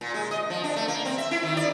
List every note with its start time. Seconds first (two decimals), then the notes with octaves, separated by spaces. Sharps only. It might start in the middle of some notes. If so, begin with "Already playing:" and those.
0.01 A#2
0.14 G#3
0.31 D#5
0.50 F3
0.64 D4
0.76 A3
0.88 A#3
1.05 C4
1.18 E5
1.31 E4
1.43 D#3
1.57 D5